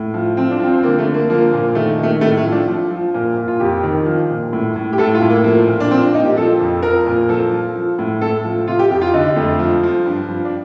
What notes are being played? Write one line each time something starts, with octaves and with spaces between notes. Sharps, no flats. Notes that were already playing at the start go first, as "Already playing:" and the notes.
Already playing: A2
F3
F3 C4
D4
F3 C4
C4
D3 A#3
A3
D3
A#3
F3 A#3
A#2
D#3 A3
D#3 A3
A2 A3
A3
F3
D4
F3
F3
A#2
A#2
F4
F2 G4
D#3
F3
A#2
A2
A2
G4
A2 A4
F4
A2
A#3
F3 A#3
A#2
D4
F3 C4
D4
A#2 D#4
G4
F3 A4
F2
F3 A#4
A#2
F3 A4
F3
F3
A2
A2 A4
F3
C3 F4
G4
F2 G4
F4
D3 D#4
F2 A3
F3
F3
G2
F3
D4